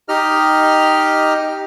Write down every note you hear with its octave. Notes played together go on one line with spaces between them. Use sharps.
D#4 G4 D#5 F6